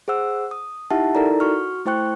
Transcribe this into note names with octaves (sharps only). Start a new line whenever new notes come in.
G#4 C5 F#5 E6
D#6
D#4 E4 G4 E5 F#5 A5
D#4 E4 A4 A#4 D5 A#5
F#4 C#6 F6
A3 E4 C5 G5 C#6 F#6